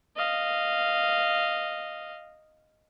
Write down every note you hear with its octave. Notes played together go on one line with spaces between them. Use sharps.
D#5 F5